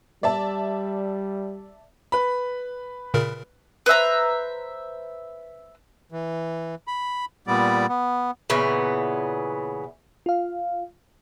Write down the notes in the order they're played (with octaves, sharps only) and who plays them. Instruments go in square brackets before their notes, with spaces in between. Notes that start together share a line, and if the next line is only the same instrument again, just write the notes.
[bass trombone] G3 [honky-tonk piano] D5 E5 A5
[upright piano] B4 B5
[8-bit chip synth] A#2 C#3 A#4
[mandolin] B4 C5 E5 A#5
[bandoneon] E3
B5
A#2 G3 B3 D5
B3
[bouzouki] A#2 C#3 E3 B3
[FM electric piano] F4 F5